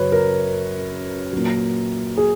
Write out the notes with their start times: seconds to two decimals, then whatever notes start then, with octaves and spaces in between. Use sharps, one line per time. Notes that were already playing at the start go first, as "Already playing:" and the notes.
Already playing: F#2 C#3 F#3 B4 C#5
0.12 A#4
1.33 A#2 F#3
2.17 G#4